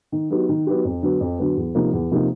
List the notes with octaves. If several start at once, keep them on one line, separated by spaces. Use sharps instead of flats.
D#3
F#3 B3 D#4 G4
D#3
F#3 B3 D#4 G4
F2
D3 F#3 B3
F2
D3 F#3 B3
E2
C3 F3 A#3 D#4
E2
C3 F3 A#3 D#4